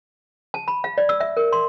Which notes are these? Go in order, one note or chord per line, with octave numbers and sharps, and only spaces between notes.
A5
B5
F5
D5
E6
E5
A#4
C6